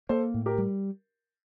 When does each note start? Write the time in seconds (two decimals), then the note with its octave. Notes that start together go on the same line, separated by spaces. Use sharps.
0.09 A#3 A4 C5
0.34 A2
0.46 G4 A#4
0.58 G3